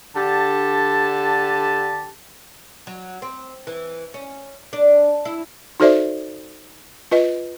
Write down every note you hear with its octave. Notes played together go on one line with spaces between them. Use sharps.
D3 G4 A5
F#3
C4
E3
C#4
D4
E4
D#4 F#4 A4 C5 D5 E5
F4 B4 D#5